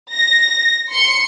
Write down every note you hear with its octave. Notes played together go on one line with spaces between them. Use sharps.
A#6
C6 C#7